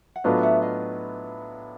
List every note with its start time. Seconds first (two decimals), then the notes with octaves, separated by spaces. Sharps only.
0.16 F#5
0.24 A2 F#3 B3 D4 F4 D#5 F5
0.43 E5 F#5
0.62 D#5 F5